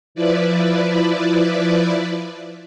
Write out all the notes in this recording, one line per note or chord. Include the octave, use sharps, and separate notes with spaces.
F3 E4 B4 D5